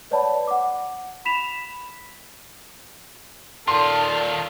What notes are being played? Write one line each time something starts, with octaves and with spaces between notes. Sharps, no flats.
B4 C#5 D5 F#5 A5 B5
F#5 D6
B5 B6 E7 F7
D#3 F4 A4 D5 C6